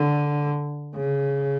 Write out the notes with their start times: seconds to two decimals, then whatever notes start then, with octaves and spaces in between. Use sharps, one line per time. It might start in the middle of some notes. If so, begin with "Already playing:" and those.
Already playing: D3
0.96 C#3